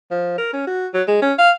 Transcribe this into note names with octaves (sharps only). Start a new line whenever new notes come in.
F3
A#4
C#4
F#4
F#3
G#3
C#4
F5